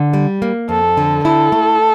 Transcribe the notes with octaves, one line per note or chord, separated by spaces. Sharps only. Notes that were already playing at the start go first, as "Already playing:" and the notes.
Already playing: D3
G3
A#3
F2 A4
D3
E4 A4
A3